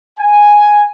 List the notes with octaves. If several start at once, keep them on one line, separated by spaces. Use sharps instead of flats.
G#5